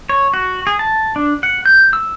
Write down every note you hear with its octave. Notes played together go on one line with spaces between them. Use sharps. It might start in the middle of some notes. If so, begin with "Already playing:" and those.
C#5
F#4
G#4
A5
D4
F#5
G6
E6